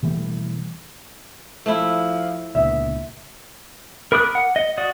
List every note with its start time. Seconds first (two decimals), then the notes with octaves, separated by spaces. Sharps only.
0.03 B2 E3 G3 A3
1.66 F3 A3 E4
2.55 C#2 A#2 D3 B3 E5
4.12 A#4 B5 D6 D#6 F#6
4.35 F#5
4.56 D#5
4.78 F#4 D5 D#6